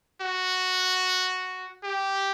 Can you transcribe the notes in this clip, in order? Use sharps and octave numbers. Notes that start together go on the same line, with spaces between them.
F#4
G4